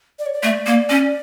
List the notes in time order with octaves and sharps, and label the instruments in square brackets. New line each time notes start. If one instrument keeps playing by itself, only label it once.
[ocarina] D5
C#5
D5
[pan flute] A3
A#3
C#4